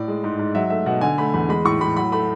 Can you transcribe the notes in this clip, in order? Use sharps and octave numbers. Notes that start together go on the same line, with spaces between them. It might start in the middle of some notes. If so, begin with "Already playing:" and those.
Already playing: A2 D5
G#3
G#2
G#2
F#3 E5
A3 E5
B2 F#5
D3 G#5
A3 B5
E2 B5
G#3 B5
A2 C#6
A2 B5
F#3 B5
A3 B5